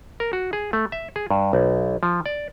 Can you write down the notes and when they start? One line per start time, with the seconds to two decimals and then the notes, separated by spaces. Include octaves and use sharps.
0.20 A#4
0.33 F#4
0.53 G#4
0.73 A3
0.92 E5
1.16 G#4
1.31 G2
1.53 B1
2.03 F3
2.26 D5